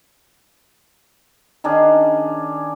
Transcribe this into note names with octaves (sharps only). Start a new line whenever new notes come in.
D#3 C#4 D4 G#4